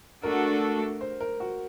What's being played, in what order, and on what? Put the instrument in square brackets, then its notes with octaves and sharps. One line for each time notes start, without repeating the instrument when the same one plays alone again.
[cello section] A3 D4 F#4 A4 [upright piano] A#4
[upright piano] C5
A#4
F#4